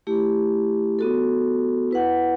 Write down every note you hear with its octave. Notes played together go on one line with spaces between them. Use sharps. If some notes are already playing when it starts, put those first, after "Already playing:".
A3 E4 G4
B3 F#4 A4
E4 B4 F#5